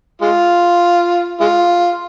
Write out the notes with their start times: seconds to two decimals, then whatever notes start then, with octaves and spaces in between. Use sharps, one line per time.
0.22 G#3 F4
1.41 G#3 F4